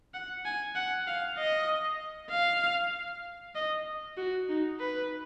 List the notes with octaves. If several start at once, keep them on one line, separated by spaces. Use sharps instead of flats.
F#5
G#5
F#5
F5
D#5
F5
D#5
F#4
D#4
B4